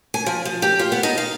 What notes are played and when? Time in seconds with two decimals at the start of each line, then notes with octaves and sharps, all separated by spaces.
0.14 G#5
0.26 F3
0.45 F3
0.62 G4
0.79 F4
0.92 B3
1.03 D#4
1.18 F5